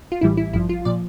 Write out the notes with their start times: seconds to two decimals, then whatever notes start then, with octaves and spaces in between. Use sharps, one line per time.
0.12 F4
0.21 A#1 A2 E3 G3 E4
0.37 E4
0.53 A1 G2 F3 E4
0.69 F4
0.85 A#2 F3 D5